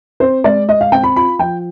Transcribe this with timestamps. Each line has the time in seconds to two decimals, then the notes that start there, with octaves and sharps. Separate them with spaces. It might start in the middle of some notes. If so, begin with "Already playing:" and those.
0.20 C4 C5
0.44 G#3 D5
0.68 G#3 D#5
0.81 F5
0.92 C4 G5
1.03 B5
1.16 F4 B5
1.39 F3 G5